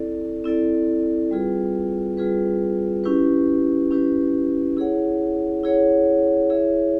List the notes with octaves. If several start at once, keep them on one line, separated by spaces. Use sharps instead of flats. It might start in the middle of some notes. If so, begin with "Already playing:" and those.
Already playing: C4 E4 A4 D5
C4 E4 A4 D5
G3 C4 F4 G#4 B4
G3 C4 F4 G#4 B4
C#4 E4 G4 B4
C#4 E4 G4 B4
E4 G#4 C#5 F#5
E4 G#4 C#5 F#5
E4 G#4 C#5 E5